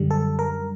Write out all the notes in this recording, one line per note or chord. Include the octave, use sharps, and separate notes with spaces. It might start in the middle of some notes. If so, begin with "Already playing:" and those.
Already playing: F#2 D3 G3
A4
A#4